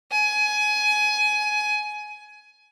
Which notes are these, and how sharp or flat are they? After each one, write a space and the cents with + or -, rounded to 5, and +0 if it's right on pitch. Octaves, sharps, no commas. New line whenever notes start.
G#5 +20